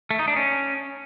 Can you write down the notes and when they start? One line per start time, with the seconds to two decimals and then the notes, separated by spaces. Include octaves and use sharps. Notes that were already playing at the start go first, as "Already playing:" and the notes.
0.11 A3
0.19 D#4
0.28 D4
0.36 C#4